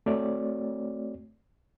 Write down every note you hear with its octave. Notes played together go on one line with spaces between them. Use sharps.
A3 C4 F#4 C#5 D5